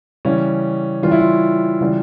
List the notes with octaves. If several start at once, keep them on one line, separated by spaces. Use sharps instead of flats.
C#3 E3 G3 C#4
C#3 E3 G3 F4
E4
F4
C#3 E3 G3